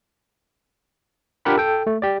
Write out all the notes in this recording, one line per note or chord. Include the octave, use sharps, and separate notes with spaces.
D4 F4 G4 A#4 F#5 B5
A4 G5
A3
G4 D5